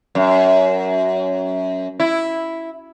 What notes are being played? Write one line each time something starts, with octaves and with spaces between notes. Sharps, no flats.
F#2
E4